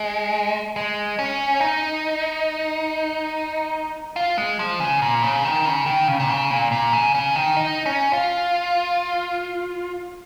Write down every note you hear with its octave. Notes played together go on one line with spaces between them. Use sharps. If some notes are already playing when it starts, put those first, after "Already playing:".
Already playing: G#3
G#3
C#4
D#4
F4
G#3
F3
C#3
A#2
C#3
D#3
C#3
D#3
C#3
A#2
C#3
A#2
A#2
C#3
C#3
D#3
D#4
C#4
F4